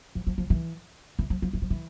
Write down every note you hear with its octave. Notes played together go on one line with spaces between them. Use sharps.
F3
F3
F3
E3
E3
F3
F3
E3
F3
E3